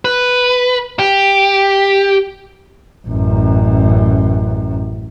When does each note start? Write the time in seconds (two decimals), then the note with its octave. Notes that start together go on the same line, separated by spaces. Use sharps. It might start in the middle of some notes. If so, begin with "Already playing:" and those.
0.05 B4
0.99 G4
3.08 A1 F#2